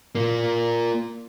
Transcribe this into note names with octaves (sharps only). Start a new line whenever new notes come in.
A#3 F4